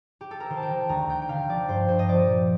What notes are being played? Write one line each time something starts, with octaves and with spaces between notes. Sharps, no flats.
G4
A4
A#4
D#3 C5
A5
G5
D#3
D2 A#5
D2 G5
G5
D3 F5
F3 D5
G2 C5
G2 C5
D#5
F3 D5
A#2